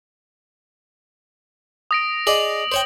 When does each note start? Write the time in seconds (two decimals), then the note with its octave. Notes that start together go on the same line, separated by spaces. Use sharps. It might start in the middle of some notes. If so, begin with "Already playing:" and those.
1.91 D#6 A#6 D7
2.27 G#4 D5 D#5 F#7
2.72 C5 C#5 G5